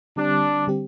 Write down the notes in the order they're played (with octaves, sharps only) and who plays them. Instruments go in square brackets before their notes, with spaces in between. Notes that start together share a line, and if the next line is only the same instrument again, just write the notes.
[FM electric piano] D3 G3 C4 G4 [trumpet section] D4
[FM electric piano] D3 G3 C4 G4